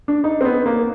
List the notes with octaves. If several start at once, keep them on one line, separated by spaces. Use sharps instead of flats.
D4
D#4
C4
B3
A#3